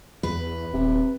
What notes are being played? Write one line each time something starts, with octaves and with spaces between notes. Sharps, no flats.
E2 B4
D#1 C3